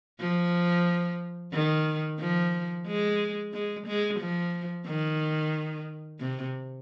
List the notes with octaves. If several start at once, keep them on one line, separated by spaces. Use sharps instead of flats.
F3
D#3
F3
G#3
G#3
G#3
F3
D#3
C3